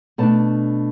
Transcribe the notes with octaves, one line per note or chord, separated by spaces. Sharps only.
B2 A3 D4 A5